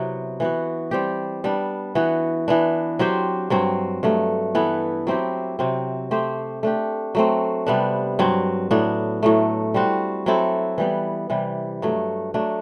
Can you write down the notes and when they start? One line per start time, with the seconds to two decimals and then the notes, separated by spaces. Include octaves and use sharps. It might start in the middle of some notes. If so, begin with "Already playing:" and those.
Already playing: C3 F#3 B3 E4
0.40 E3 B3 F#4
0.91 G3 C4 G4
1.44 G3 B3 D4
1.95 E3 B3 F#4
2.48 E3 B3 D4
2.99 F#3 C4 G4 C5
3.50 G2 F#3 C4
4.03 G2 F#3 A3
4.55 E3 B3 E4 A4
5.07 F#3 C4 E4 G4
5.59 C3 F#3 C4
6.11 A3 C4 G4 C5
6.63 A3 D4 G4
7.15 F#3 A3 C4
7.67 C3 G3 B3 D4
8.19 G2 F#3 C4
8.71 A2 F#3 B3 D4
9.23 A2 F#3 A3
9.74 G3 C4 F#4
10.26 F#3 C4 E4 A4
10.78 E3 G3 B3
11.30 C3 E3 G3
11.82 G2 F#3 A3
12.34 F#3 A3 D4